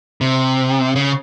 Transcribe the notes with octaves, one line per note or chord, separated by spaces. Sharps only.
C3
C#3